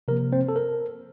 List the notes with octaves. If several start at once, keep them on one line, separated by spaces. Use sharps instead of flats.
C3 F3 A#3 A#4
C4 C5
A4
A#4